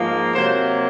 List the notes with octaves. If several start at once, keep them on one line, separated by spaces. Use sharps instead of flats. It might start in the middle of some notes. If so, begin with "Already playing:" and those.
Already playing: G#2 F3 A#3
C3 F#3 A#3 C5